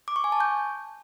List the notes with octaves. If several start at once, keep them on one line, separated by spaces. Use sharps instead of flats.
D6
C#6
G#5
A5
G6